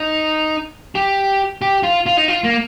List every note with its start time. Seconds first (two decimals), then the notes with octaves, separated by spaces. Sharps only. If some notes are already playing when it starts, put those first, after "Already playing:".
Already playing: D#4
0.95 G4
1.62 G4
1.83 F4
2.06 F4
2.17 D#4
2.28 F4
2.44 A#3